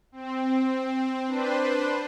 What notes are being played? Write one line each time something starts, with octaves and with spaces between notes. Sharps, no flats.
C4
D4 B4 C5